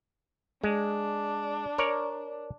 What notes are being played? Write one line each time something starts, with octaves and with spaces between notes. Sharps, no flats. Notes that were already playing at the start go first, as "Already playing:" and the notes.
G#3 D4
A#4 C#5 D5